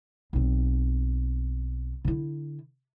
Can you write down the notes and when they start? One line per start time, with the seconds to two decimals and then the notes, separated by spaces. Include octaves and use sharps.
0.33 B1 C4
2.05 D3 E4